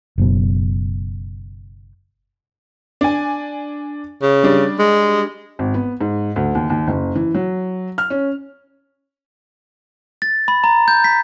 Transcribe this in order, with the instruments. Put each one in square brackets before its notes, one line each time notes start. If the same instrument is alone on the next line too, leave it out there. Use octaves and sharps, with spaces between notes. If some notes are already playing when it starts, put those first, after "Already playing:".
[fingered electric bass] F#1 F#2 B2
[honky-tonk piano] D4 G#5
[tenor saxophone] C#3
[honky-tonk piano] G3 D4
[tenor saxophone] G#3
[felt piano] G#1
B3
G#2
D2
D#2
D#2
F#1
E3
F#3
F6
C#4
[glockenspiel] A6
B5
A#5
G6
B6